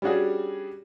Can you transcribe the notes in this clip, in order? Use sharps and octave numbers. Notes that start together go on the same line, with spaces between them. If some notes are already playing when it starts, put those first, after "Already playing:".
G3 C#4 D4 F#4 G#4